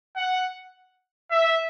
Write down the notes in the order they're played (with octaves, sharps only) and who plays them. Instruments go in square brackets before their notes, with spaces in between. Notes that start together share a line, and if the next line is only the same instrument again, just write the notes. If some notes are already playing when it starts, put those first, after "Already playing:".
[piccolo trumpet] F#5
E5